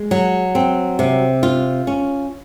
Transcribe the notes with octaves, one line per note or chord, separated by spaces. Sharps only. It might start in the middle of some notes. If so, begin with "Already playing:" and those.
Already playing: G#3
F#3
C4
C3
F4
C#4